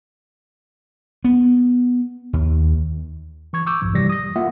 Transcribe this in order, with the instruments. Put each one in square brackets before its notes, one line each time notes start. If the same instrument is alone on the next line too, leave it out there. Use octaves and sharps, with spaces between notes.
[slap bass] B3
D#2
[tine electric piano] E3 C#6 G#6
C#6 D6 E6 G6
A#1 F2 G#2 F3
C3 E3 G3 A#6
D#6 A#6
A#3 F4 E5 F#5